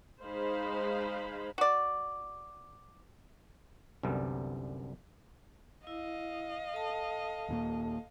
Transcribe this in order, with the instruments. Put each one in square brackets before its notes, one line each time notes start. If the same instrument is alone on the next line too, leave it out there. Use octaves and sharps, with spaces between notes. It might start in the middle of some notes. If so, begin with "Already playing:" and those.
[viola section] G#3 D#4 G#4 C5 F5 B5
[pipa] F#4 D5
[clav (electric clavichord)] C2 F#2 D3 G3 B3
[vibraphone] E4 [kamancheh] D#5 F5
[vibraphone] A4 A5
[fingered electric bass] D#2 A#2 A#3